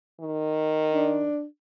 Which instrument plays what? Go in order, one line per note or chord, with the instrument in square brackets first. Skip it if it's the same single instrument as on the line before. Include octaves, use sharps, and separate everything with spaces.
[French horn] D#3
[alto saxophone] D4